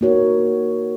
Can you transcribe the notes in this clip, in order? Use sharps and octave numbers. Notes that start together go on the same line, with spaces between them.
A#3 D#4 F#4 A#4 C#5